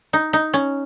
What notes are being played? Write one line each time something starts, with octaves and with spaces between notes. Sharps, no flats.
D#4
D#4
C#4